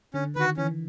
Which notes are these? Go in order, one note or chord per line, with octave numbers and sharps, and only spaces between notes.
D3 C#4
D#3 F#4 B4
E3 C#4